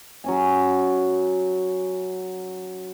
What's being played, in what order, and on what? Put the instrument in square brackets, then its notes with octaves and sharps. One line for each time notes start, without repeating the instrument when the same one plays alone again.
[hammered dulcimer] F#3 C#4 G#5